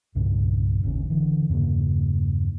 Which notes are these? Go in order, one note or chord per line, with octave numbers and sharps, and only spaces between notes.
C2 G2 A#2 C#3
D#1 G#1 C#3 C#4
D3 E3
E2 G2 C#3 A#3